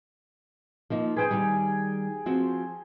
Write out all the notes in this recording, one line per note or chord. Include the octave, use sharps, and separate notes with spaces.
F3 A#3 D#4
G#4 B4 C5 G5 G#5
D#3 G3
F3 C4 F#4